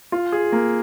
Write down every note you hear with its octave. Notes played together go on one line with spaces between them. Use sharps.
F4
G#4
A#3